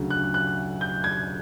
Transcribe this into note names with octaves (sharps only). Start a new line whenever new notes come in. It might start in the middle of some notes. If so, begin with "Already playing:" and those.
Already playing: D2 C#3 F#3
F#6
F#6
G6
G#6